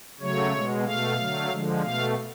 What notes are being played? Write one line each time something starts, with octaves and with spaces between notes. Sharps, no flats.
C#3 F#3 A3 C#5
B2 G#3
B2 A3 F5
D3 F#3 A3
D3 F3 G#3
B2 A3 F5